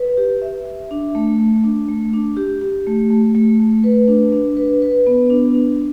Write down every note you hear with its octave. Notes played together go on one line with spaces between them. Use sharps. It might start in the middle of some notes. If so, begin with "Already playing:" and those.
Already playing: B4
G4
E5
E5
D4
A3
A3
D4
A3
D4
G4
G4
A3
A3
A3
A3
B4
D4
D4
B4
B4
B3
D4
D4